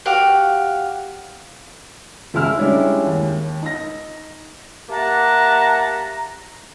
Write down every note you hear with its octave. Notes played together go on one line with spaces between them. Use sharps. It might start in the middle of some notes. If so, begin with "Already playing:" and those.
F#4 G4 F5 F#5
C#2 G#3 E4 E6 F6
G3 G#3 C#4 D4 E4
D#2
D#4 A#6
A#3 G4 E5 F#5 A5 A#5